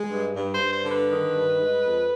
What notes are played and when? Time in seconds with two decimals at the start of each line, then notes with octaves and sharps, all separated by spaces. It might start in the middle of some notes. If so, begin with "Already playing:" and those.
Already playing: G#3
0.08 G2
0.33 G2
0.52 C5
0.59 G2
0.71 C5
0.83 D3
0.89 B4
1.09 D#3
1.34 G2
1.59 G#3
1.83 F2